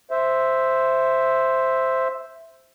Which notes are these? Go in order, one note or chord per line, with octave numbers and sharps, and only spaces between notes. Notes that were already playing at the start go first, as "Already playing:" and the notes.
C5 E5